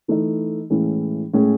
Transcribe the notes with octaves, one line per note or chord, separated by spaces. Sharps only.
E3 A3 D#4
A2 E3 G#3 C#4
A2 G#3 C#4 G#4